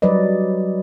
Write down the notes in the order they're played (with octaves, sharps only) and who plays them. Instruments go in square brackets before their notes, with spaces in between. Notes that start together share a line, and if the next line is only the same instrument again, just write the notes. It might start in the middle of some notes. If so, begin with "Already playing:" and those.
[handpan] F#3 G3 B4 D5 D#5